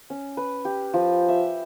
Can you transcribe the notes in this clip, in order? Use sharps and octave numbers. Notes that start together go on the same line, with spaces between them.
C#4
B4
G4
F3
E5